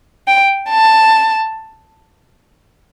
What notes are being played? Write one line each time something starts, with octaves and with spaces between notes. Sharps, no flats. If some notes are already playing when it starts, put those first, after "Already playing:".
G5
A5